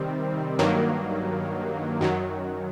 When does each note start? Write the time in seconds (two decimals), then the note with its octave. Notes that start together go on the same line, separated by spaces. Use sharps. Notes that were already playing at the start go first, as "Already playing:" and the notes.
Already playing: C3 D#3 G3 C4
0.59 G2 D#3 F#3 A#3
2.01 F#2 D#3 F#3